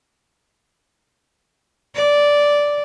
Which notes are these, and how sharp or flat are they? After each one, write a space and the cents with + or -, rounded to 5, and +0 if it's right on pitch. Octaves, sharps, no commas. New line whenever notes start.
D5 -10